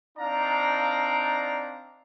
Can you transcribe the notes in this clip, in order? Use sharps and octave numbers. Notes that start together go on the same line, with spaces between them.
C4 D4 D#4 D5 F5 A#5